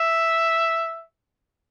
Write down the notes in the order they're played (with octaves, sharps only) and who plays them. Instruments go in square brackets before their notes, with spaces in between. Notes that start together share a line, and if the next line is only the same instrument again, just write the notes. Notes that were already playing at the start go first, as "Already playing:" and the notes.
Already playing: [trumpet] E5